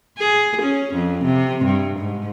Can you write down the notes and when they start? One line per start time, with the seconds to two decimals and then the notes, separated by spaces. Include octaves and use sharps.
0.19 G#4
0.62 C#4
0.95 F2
1.25 C3
1.65 G2
1.98 G#2